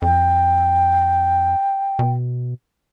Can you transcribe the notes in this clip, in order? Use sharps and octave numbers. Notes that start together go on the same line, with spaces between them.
F2 G5
B2